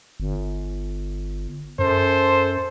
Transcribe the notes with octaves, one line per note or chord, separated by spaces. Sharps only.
G1
F#2 A4 C5